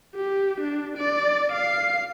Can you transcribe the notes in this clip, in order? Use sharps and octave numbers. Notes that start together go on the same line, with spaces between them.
G4
D4
D5
F5 C7